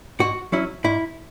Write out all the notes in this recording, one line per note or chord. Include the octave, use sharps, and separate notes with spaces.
G#2 F#4
F#3 C#4 E4
G#2 E4